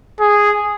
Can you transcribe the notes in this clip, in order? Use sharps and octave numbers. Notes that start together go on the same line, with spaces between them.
G#4